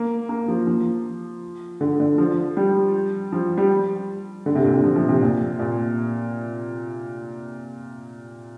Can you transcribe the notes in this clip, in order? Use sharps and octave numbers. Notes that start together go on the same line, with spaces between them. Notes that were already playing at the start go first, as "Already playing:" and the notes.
Already playing: A#3
A#3
F3
F3
D3
D3
F3
G3
F3
G3
D3
C3
A#2
C3
F3
F3
C3
A#2
A#2